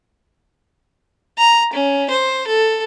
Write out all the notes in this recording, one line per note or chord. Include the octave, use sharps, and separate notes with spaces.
A#5
C#4
C5
A4